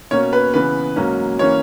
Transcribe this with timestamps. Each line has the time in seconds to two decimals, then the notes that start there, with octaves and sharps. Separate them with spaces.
0.11 B2 A#3 C#4 C#5
0.33 B4
0.54 C#3 E3 B3 B4
0.96 G#2 F#3 A#3 C#4
1.39 E3 A#3 C#4 C#5